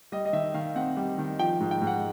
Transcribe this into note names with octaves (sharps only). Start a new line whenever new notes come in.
G3 D#5
D#5
D#3 E5
D#3 F5
C4 F#5
G3
D#3
F3 G5
G#2
G5
G#2
F#5